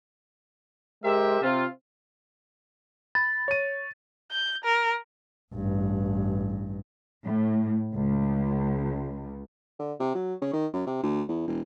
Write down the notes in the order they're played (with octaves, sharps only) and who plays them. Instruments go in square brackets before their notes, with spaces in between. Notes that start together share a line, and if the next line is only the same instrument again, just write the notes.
[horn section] G#3 G4 A#4 C5 E5
C3 C4 F4
[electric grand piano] B5 [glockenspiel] A6
[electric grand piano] C#5 D#7
[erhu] G6
A#4
[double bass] A1 G2
[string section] A2
C#2
[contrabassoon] D3
C3
F#3
C#3
D#3
F#2
C3
D2
E2
E1